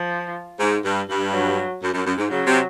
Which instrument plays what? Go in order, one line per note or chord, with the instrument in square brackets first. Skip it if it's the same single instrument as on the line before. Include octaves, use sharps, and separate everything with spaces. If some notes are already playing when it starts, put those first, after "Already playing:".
Already playing: [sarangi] F3
[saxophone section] G#2
G2
G2
[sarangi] F#3
[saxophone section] F#2
F#2
F#2
G#2
[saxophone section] C#3 [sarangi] F#3
[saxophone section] C3